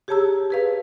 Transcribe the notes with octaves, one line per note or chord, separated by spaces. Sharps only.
G4 G#4 C#5 A5 A#5 E6
G#4 B4 F5